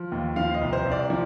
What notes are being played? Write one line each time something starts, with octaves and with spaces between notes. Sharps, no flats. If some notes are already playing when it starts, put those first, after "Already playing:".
Already playing: F3
D#2
F3 F5
D#5
C2
C5
C2
D5
F3